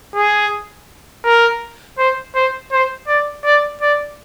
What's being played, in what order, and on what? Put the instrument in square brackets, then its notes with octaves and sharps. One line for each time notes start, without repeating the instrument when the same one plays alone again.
[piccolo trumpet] G#4
A#4
C5
C5
C5
D5
D5
D5